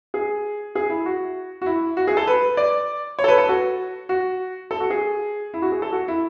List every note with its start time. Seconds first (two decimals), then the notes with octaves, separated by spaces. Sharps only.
0.14 G#4
0.75 G#4
0.90 E4
1.06 F#4
1.62 F#4
1.66 E4
1.97 F#4
2.07 G#4
2.17 A4
2.27 B4
2.57 D5
3.19 C#5
3.24 A4
3.28 B4
3.38 A4
3.49 F#4
4.09 F#4
4.71 A4
4.80 F#4
4.90 G#4
5.54 E4
5.62 F#4
5.72 G#4
5.82 A4
5.92 F#4
6.08 E4